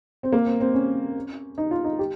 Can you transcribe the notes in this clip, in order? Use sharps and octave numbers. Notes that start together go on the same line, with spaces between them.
C4
A#3
C4
C4
C#4
D#4
F4
D#4
G4